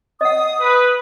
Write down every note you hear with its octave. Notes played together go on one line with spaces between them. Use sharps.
D#5 F#5 D#6
B4